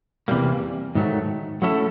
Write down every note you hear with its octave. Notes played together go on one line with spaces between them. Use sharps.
E2 C3 E3 G3 A#3
G#2 D#3 F#3 A3
F#3 A3 C#4 E4 A4